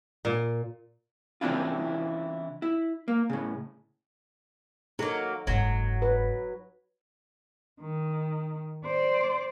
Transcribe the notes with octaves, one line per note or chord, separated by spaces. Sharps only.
A#2
C#3 E3 C4 D4 E4 F4
E4
A#3
A2 C#3
F#3 A#3 D#4 A4
F#1 G#2 F#3
B4
D#3
C5 D5